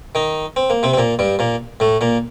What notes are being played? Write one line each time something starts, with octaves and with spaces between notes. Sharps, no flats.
D#3 D#4
C4
A#3
C3 C4
C4
A#2 A#3
G2 G3
A#2 A#3
A2 A3
A#2 A#3